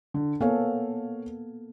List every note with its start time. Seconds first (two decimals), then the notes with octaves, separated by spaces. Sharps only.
0.14 D3
0.41 A#3 B3 A4 C#5 F5 G#5